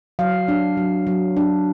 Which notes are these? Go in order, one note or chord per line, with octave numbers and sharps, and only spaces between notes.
F#3 F5
D4
F#3
F#3
D4